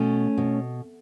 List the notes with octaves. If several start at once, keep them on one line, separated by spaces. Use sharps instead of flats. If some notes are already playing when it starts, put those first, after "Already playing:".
Already playing: B2 A3 C#4
B2